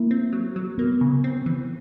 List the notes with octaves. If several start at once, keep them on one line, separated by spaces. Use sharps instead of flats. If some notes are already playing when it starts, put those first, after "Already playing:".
Already playing: A#3 E4
C4
F#3
F#3
A#3 B3
C#3
C4
E3